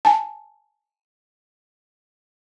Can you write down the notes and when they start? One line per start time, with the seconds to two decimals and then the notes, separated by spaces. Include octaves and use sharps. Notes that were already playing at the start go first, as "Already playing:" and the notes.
0.05 G#5 A5